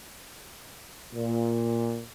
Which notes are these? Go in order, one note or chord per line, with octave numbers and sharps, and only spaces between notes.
A#2